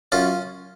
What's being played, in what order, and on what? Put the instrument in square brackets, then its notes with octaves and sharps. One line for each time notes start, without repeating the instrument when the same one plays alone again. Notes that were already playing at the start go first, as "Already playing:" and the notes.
[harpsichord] F#2 C#4 F4